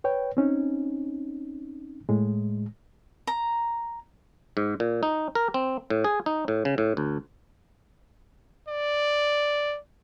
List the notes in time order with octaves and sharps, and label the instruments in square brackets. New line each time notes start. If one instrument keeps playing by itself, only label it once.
[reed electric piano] B4 C#5 G5
C4 C#4 D#4
A2 G#3
[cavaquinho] A#5
[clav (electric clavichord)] G#2
A#2
D#4
A#4
C4
A2
G#4
D#4
A2
C#3
A2
D2
[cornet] D5